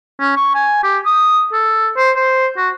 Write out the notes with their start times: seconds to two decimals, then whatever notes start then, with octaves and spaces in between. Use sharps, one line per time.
0.20 C#4
0.36 C#6
0.55 G#5
0.83 G4
1.06 D#6
1.53 A4
1.97 C5
2.16 C5
2.57 F#4